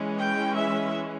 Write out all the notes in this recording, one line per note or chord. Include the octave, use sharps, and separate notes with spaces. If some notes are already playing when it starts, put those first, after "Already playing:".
Already playing: E3 G#3 C#4
G5
E5